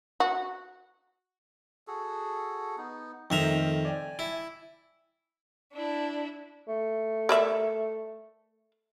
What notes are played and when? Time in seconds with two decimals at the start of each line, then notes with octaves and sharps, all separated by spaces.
0.20 F#4
1.87 F#4 G#4 A4
2.78 B3 D#4
3.30 F2 D#3 A3 D#4 A#4 E5 A#5
3.85 D5 G5 G#5
4.19 E4
5.72 D4 E4
6.68 A3
7.29 A#4 D5 E5